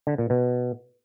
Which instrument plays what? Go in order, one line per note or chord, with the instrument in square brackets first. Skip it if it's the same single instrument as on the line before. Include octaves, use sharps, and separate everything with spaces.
[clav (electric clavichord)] D3
A#2
B2